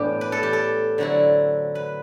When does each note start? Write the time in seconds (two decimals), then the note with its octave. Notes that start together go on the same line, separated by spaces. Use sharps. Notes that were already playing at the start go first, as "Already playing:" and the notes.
Already playing: A2 E3 G3 B3 D4 G4
0.21 B4
0.32 A4
0.43 G4
0.53 A4
0.98 D3 F#3 C4 E4
1.75 B4